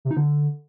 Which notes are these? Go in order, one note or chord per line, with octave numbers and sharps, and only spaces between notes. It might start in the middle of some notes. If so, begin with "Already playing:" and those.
C3
D#4
D3